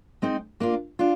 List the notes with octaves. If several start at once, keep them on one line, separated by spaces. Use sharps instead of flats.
G#3 C4 D#4
A#3 D4 F4
D4 F4